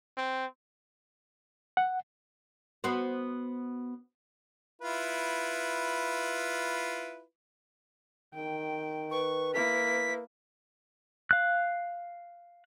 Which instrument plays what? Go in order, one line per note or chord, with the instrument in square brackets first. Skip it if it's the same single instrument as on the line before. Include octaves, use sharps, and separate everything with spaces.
[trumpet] C4
[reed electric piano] F#5
[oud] B3 F#4 C5
[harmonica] E4 F4 B4
[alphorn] D#3 [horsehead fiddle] G5
[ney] B4 [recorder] C#6
[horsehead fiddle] A#3 E4 [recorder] B6
[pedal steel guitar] F5 F#6